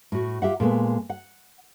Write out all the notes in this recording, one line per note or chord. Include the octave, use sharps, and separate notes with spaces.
A2 F#4
F4 G4 E5 F#5
A#2 G#3 A3 B3
F#5